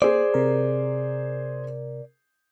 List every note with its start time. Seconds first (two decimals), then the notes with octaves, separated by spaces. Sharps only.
0.02 A#3 G#4 C5 D5
0.34 C3 A#4